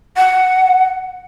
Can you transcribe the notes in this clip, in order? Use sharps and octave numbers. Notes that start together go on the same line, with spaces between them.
F#5